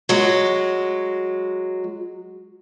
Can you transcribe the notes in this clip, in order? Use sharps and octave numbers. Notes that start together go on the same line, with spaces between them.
F#3 G#3